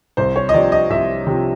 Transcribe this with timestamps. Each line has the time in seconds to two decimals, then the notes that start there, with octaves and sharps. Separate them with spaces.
0.17 C2 C5
0.36 C#5
0.49 D#5
0.54 C3 F3 D5
0.72 D#5
0.90 C2 E5
1.27 C3 F3